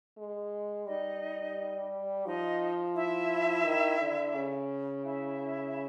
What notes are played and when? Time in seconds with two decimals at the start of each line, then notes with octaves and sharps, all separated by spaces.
0.18 G#3
0.87 G3 D#4 D#5
2.25 F3 D#4 D#5
2.95 E4 E5
3.64 D#3
3.99 D3
4.34 C#3
5.04 E4 E5